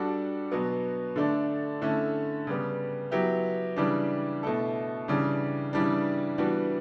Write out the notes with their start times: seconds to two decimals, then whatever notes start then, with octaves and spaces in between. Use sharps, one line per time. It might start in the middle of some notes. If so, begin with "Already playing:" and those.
Already playing: G3 D4 F#4 A4
0.51 B2 F#3 B3
1.16 D3 A3 D4
1.81 D3 A3 C#4 E4
2.47 C#3 G3 B3
3.11 F#3 B3 E4 G4
3.77 C#3 E3 G3 D4
4.43 B2 A3 E4 A4
5.08 C#3 E3 G3 D4
5.73 C#3 E3 G3 D4
6.38 E3 G3 B3 D4 F#4